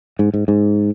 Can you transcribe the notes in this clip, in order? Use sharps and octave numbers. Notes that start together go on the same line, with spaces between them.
G#2
G#2
G#2